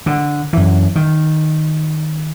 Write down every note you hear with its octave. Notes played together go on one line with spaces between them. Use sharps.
D3
F#2 E3
D#3